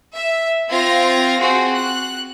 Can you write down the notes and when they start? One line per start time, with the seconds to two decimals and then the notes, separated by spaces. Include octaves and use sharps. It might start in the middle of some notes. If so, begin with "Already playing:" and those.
0.15 E5
0.69 C4 F4 G#6 A#6
1.39 C4 F#4 G#4
1.73 F#6